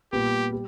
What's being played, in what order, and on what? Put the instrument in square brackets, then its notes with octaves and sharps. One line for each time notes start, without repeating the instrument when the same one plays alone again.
[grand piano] A#2 G3 B3 [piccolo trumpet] G4
[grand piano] G3